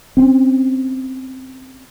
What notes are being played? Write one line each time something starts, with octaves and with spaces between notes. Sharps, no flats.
C4 C#4